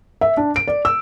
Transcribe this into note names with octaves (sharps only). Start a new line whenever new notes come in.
E5
D4
D7
D5
E6